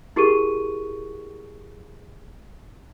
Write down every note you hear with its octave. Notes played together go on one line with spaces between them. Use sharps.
E4 G4 G#4 A#4 C#6 D#7